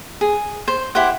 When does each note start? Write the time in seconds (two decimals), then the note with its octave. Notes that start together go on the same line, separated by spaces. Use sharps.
0.21 G#4
0.68 C5
0.95 E4 G4 C5 F#5